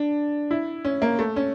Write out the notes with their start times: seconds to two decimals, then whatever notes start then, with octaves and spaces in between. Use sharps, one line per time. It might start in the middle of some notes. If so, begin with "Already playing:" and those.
Already playing: D4
0.51 E4
0.85 C#4
1.02 A#3
1.19 A3
1.36 C#4